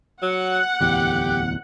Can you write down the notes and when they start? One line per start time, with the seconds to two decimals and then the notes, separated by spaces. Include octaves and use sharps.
0.22 F#3 F#5
0.81 D1 E2 G4